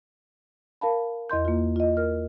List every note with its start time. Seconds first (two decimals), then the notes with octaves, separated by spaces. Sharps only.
0.81 A#4 F5 A5 B5
1.30 E2 D#5 C6 G6
1.45 A#3 F4
1.76 F4 D#5
1.97 A#4 F6